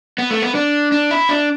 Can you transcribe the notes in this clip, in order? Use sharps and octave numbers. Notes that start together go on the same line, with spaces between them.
B3
A3
B3
D4
D4
E4
D4